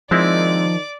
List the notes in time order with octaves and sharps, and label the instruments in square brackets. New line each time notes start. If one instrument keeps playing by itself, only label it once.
[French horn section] D#3 D#4 [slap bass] F3 [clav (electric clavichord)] G#3 C4 E4 [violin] D5